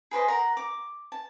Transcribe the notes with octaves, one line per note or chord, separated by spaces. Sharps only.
G#4 B4 C5 D#5
A#4 F#5 A#5
D6
A5